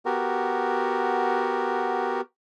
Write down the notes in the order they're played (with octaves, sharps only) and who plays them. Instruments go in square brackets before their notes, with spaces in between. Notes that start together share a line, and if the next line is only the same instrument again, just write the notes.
[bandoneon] B3 F#4 G4 A#4